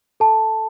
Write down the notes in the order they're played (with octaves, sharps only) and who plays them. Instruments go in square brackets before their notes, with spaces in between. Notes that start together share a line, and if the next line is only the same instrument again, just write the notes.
[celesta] A4 A5